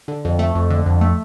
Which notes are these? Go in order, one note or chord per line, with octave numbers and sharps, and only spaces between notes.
D3
F2
A3
F2
D3
F2
A3